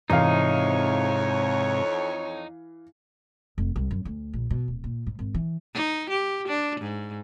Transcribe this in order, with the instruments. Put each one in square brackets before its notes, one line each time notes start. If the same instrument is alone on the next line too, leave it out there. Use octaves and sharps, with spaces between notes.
[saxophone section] F2 C#5 [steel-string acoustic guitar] G#2 C3 [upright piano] E3 F5 [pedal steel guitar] D#4
[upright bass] F1
C2
F#2
D2
A#1
B2
D1
A#2
G#2
G#1
E3
[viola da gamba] D#4
G4
D4
G#2